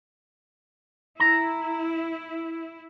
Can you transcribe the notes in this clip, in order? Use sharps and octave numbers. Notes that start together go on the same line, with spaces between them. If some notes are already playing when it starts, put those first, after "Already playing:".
E4 A#5